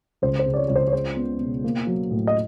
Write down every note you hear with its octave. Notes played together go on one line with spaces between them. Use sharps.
C#2 C5
C5
C#3
D5
C#5
C#2 C#5
C5
C#5
G#3 C5
B3
B2
A#3
F#3
A2
D#5